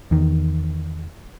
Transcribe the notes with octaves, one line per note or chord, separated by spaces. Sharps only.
E2 D#3